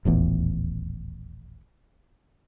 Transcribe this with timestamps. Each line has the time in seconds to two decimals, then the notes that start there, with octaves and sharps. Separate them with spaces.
0.05 D#1 A1 E2